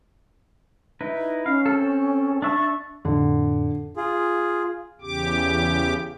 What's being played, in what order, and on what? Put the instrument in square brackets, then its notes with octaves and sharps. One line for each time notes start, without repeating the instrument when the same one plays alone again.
[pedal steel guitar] D#4 E4 B4
[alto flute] C#4 [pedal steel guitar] F5
[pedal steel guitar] C4 A4
[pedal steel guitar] D4 E5 A5 [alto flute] C#6
[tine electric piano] F2 A2 [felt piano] D3
[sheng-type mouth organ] F4 G#4
[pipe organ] E2 C#3 G4 D6